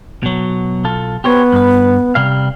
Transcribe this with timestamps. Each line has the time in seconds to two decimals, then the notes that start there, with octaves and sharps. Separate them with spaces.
0.23 B2 F#3
0.84 B1 F4 A4
1.24 B3 G4 C5 C#5
1.53 G2 B4
2.15 C3 G3 F5